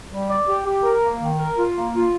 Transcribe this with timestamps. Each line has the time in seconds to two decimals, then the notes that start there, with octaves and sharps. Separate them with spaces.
0.10 G3
0.28 D5
0.47 G4
0.66 G4
0.83 A#4
1.02 A#3
1.20 D#3
1.38 A#4
1.57 F4
1.75 A#3
1.94 F4